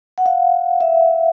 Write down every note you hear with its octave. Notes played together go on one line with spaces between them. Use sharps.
F#5
F5
E5